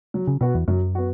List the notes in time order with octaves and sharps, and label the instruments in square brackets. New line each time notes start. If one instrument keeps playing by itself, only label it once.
[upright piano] F#3
[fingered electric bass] C#3
[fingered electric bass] B2 [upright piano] B3 F#4
[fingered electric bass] E2
[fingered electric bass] F#2 [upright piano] F#3
[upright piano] B3 F#4